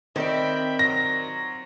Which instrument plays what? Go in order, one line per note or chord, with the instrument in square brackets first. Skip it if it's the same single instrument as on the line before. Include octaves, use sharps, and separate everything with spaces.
[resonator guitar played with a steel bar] D#3 [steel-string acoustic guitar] C4 D5 [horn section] E5 G5 B5
[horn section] F#3 F4 F#4 [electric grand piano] A#6